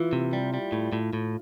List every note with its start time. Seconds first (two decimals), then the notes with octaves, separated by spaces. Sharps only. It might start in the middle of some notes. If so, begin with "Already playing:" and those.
Already playing: E3 E4 F4
0.13 C3
0.33 G3
0.54 G3
0.72 A2
0.93 A2
1.13 A2